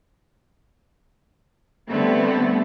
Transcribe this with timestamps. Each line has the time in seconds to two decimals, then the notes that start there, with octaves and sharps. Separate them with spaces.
1.89 D3 G3 A3 B3 C4